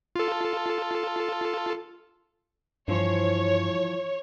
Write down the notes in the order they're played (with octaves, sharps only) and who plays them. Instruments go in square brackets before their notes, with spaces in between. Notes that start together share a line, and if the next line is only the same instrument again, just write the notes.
[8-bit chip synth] F4 A4
[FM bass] G2 [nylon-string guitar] E3 F3 C5 [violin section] C#5